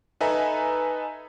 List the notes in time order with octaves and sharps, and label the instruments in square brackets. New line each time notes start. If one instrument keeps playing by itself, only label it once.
[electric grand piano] D#4 A4 B4 E5 G#5 A#5